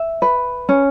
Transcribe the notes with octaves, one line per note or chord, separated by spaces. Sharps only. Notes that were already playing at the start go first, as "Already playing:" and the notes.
Already playing: E5
B4
C#4